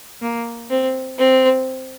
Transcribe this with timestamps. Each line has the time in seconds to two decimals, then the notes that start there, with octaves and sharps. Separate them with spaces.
0.22 A#3
0.70 C4
1.19 C4